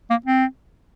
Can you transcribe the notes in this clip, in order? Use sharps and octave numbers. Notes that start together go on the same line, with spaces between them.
A#3
C4